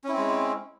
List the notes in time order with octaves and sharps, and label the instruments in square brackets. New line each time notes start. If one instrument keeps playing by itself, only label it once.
[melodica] C#4
E4
C4
G#3